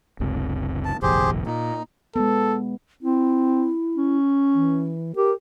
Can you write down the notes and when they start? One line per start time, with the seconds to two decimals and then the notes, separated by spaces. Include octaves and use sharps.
0.20 F#1 C#2 C3
0.85 A5
1.02 F1 A#1 D#2 G4 G#4 C5
1.46 A#2 D#4
2.16 G#3 B3 A4
3.03 C4 E4
3.96 C#4
4.55 E3
5.15 G4 A#4